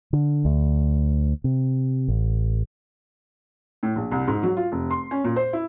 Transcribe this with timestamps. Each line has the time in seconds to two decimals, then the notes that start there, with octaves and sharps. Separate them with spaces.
0.13 D3
0.45 D2
1.44 C3
2.08 A1
3.83 A2
3.96 A#1
4.11 C2
4.28 G#2
4.43 F#3
4.57 F4
4.72 F1
4.91 C6
5.11 C#4
5.24 A#2
5.36 C5
5.53 E4